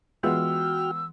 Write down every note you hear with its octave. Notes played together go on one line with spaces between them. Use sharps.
E3 G#3 B3 F4 F#4 G5 E6 F6